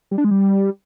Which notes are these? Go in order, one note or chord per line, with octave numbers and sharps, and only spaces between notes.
G3
D4
G#3
G3